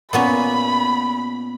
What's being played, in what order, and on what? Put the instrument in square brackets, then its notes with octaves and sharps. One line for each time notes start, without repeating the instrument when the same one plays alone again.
[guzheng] A#2 B3 C#4 [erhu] B5